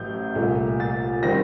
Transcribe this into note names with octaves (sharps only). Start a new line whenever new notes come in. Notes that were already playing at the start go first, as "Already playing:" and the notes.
Already playing: A1 A2 F#3 G6
C2 A#2 A3
A6
D#3 G3 C4 A#6